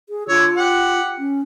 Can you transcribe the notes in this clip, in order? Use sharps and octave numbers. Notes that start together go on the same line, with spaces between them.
G#4
D3 F4 C#5 E6
G4 F#5
C#4